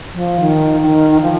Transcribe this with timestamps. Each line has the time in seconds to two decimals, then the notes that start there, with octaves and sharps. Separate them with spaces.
0.14 F3
0.41 D#3
0.82 D#3
1.21 F3